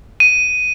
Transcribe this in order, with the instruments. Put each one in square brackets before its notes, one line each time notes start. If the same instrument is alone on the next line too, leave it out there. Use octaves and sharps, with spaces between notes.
[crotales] D#7